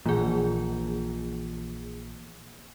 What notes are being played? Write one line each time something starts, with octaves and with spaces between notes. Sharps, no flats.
A#1 A#2 E3 G#4